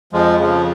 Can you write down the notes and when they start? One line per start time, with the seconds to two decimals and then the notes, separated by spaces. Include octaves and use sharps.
0.13 F2 F3 G#3
0.40 C#3 F3